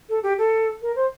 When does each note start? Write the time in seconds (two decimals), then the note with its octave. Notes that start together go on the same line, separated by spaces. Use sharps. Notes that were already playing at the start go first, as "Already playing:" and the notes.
0.09 A4
0.23 G4
0.38 A4
0.82 A#4
0.96 C5